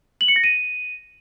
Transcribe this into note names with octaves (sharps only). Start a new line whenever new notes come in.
F#7
C#7
A#6
D#7